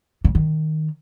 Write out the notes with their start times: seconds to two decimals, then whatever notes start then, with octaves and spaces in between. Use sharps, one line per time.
0.24 C#3
0.35 D#3